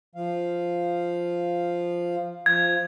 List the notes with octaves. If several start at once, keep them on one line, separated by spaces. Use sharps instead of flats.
F3 F5
F3 G#6